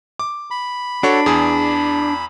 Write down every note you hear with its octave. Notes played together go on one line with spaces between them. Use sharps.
D6
B5
D4 F#4 A4 C#5
E2 G#4 D#6